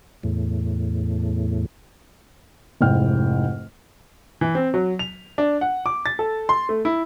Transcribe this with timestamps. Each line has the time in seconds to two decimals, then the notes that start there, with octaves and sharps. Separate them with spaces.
0.23 E2 A2
2.81 F1 G#2 E4 G5 F6
4.41 E3
4.55 C4
4.74 F#3
4.99 F7
5.38 D4
5.61 F#5
5.86 D6
6.06 A6
6.19 A4
6.49 C6
6.69 A3
6.85 E4